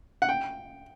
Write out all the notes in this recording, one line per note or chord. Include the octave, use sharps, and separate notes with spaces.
F#5
G5